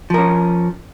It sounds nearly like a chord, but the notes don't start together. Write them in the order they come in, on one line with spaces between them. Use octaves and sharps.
F3 A#4 C#4